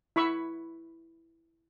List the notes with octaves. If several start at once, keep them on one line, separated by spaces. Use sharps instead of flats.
E4 B5 C#6 E6